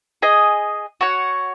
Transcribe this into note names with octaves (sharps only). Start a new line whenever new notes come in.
G#4 D#5 G#5
F#4 C#5 F#5